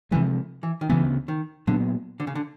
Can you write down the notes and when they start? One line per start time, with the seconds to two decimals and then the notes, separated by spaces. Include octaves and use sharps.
0.11 C3 E3 F3 G#3
0.63 E3
0.81 D#3
0.89 D2 C#3 E3 F#3 B3
1.28 D#3
1.67 A#2 D3 F#3 B3
2.20 D3
2.27 C#3
2.35 D3